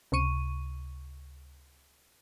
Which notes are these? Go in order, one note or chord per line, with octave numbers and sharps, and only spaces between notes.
C#2 C3 C#6 D#7